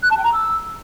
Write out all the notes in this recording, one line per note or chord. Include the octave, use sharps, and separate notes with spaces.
F#6
A5
G5
A#5
E6